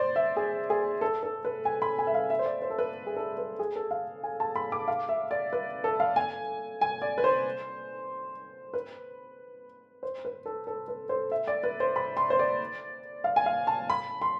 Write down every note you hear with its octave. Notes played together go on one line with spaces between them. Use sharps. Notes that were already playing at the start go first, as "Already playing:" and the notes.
Already playing: C5 D5
E5
G#4
G#4
A4
A4
B4
G#5
B5
G#5
E5
F5
E5
C5
D5
C5
A4
B4
G#4
A4
B4
G#4
A4
F5
G#5
A5
B5
D6
F5
E5
D5
B4
A4
F5
G#5
G#5
D5
B4
C5
B4
C5
B4
A4
A4
B4
C5
E5
D5
B4
C5
B5
C6
C5
D5
F5
G#5
F5
A5
B5
C6